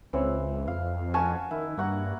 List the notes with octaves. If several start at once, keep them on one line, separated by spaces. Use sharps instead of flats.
C#2 E3 C4 C#5
F2 F5
C#4 F#4 G#5 A5 C#6
D#3 E4
G2 A#3 F#4 F#5